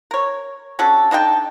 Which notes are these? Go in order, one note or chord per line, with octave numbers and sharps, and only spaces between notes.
A#4 C#5
C#4 D4 F#4 A4
D4 D#4 A4 G5